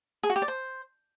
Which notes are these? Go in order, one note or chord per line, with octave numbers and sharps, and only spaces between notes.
G#4
F#4
G4
D5
C5